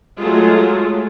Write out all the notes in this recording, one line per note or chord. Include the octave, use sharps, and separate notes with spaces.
F#3 G#3 A3 F4